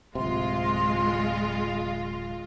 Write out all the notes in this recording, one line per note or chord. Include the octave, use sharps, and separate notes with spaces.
D1 C3 G#3 F4 C6